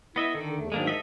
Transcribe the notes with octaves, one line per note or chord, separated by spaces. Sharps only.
B3 E4 D#5 E5
D3 D#3 A4
E2 A3
G#2 D#3 F#3 G#3 A#3 D4
A4 D#5 E5